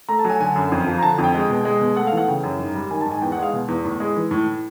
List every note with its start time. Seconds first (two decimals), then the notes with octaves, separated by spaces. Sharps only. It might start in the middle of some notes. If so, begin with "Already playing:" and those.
0.09 A3 A#5
0.19 A5
0.25 F#3 G#5
0.40 D3 G#5
0.56 F#2
0.72 F2
0.87 F3
0.98 A#5
1.03 D3 A5
1.18 F2
1.23 G5
1.34 G#3
1.50 B2
1.65 G#3
1.81 B2
1.96 A3 F#5
2.07 F5
2.12 E3
2.17 F#5
2.28 C#3 G5
2.43 F#2
2.59 G#2
2.75 G3
2.91 D#3 G#5
3.01 A5
3.06 G#2
3.12 G#5
3.22 E2 G5
3.32 F#5
3.38 G#3 F5
3.53 B2
3.68 E2
3.85 A2
4.00 G#3
4.16 E3
4.31 A2